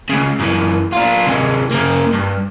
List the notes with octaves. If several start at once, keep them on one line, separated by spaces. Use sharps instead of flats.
C#2 C#3
F#2 E3
D4 F4
C3 G#3
C#3 A#3
G2